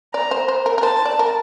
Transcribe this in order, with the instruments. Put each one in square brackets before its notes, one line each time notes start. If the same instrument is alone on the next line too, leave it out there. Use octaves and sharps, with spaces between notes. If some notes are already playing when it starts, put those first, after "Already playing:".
[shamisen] D5 [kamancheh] A#5
[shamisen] C5
C5
A#4
A#4
[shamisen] C5 [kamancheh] A5
[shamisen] D5
A#4